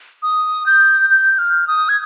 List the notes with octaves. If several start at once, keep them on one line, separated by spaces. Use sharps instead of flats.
D#6
G6
G6
F6
D#6
G#6